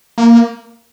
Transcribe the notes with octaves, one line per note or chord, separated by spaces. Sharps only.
A#3